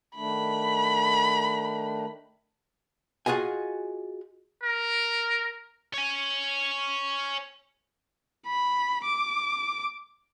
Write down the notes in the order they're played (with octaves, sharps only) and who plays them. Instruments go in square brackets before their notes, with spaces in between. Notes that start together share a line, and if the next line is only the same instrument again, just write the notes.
[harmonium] D#3 A3 D4 [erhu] B5
[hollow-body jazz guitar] F4 F#4 G#4 D#5 G#5
[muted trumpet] A#4
[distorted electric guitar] C#5 G#5
[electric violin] B5
D6